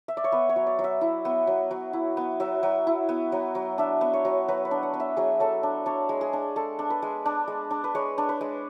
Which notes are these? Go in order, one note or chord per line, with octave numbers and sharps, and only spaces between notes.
E5
D5
C#5
B3 B4
C#5
F#3
D5
F#3
E5
E4
B3
F#3
F#3
E4
B3
F#3 E5
F#3
E4
B3
F#3
F#3
D4 E5
B3
C#5
F#3
F#3 B4
B4
D4
F#5
B3
E5
F#3 G#4
F#3 A4
D4
D4 C#5
G#3
G#4
D4
G#3 A4
D4
B4
G#3
D4
G#3
D4
B4
G#3 C#5
D4
B4
G#3